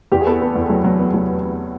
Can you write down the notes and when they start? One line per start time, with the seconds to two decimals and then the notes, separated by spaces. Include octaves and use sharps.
0.12 E2 G4
0.21 G#4
0.27 B3 A4
0.41 B3
0.56 E2
0.70 F#3
0.84 F#3
0.99 B3
1.14 F#3